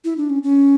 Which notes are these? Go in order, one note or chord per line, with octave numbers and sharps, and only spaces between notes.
E4
D4
C#4
C#4